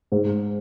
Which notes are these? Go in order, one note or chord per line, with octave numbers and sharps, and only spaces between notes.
G#2